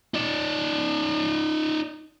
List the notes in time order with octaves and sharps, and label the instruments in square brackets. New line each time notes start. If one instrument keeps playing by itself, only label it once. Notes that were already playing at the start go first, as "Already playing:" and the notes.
[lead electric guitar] D#4 D5